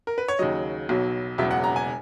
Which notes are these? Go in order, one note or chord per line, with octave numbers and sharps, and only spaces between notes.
A#4
B4
C#5
D#2 C#3 F#3 D#5
B1 B2 F#3
E1 E2 C#3 F#3 E5
F#5
A#5
G#5